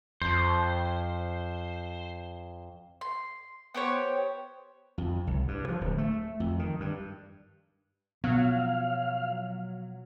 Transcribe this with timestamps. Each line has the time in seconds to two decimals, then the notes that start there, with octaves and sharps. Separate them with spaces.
0.22 F2 C5
3.01 C6
3.74 B3 G4 C5 C#5
4.98 F2
5.27 C2
5.48 G2
5.69 F3
5.81 D1
5.98 A3
6.40 F2
6.59 D#3
6.80 G2
8.24 B2 F3 F#3 B3 F5